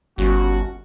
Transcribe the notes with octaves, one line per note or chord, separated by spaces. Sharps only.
G1 G3 C#4 F#4